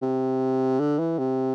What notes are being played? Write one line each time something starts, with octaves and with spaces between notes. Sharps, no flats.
C3
D3
E3
C3